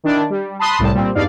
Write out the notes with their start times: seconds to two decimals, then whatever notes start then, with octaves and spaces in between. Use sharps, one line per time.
0.04 D#3 D4 E4
0.30 G3
0.59 A5 B5 C6 D#6 F#6
0.79 C2 A2 G3 A5
0.93 A#2 G3 C4
1.15 E2 G2 D#4 D5 F5